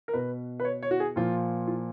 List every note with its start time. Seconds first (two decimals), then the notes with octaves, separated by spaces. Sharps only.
0.08 A#4
0.13 B2 B4
0.60 B4
0.65 C#5
0.83 C#5
0.91 F#4
1.00 G#4
1.16 A#2 F3 F4
1.67 F4